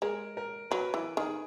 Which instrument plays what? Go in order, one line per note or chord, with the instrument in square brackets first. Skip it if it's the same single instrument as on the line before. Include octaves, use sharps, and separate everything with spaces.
[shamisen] G#3 [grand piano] A#4
[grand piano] A#4
[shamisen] F#3 [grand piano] B4
[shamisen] E3
[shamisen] D#3 [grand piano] G#4